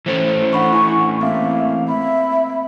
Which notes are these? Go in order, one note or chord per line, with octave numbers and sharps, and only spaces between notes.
E3 A3 C#4 C5
D4 F#5 B5 C#6
E4 G#5 C#6
A#3 C4 E5 F5
E5 B5